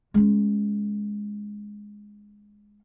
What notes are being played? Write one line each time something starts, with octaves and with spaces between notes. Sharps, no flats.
G#3 C#4